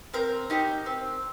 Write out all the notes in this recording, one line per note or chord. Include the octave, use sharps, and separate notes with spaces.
C4 A#4
D#4 G4
C4